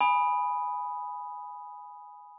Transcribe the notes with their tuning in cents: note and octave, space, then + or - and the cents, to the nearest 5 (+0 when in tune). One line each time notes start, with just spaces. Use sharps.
G#5 +0 B5 +0 D#6 +0